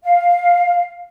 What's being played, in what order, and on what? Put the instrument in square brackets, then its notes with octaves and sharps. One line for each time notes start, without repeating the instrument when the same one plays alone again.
[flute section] F5